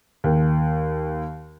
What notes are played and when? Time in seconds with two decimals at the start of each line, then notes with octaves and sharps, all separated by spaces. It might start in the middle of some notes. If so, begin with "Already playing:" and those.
0.24 D#2